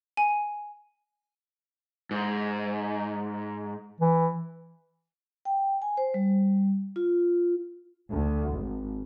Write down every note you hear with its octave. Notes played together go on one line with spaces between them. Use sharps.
G#5
G#2
E3
G5
G#5
C5
G3
F4
D2
G#1